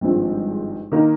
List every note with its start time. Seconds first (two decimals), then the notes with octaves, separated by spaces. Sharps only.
0.01 G#1 G2 F3 G#3 C4
0.92 D#3 A#3 D#4 A#4